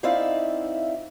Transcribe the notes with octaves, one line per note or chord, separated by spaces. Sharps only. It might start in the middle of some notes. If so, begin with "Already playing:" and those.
C4 D#4 E4 D5 E5 F5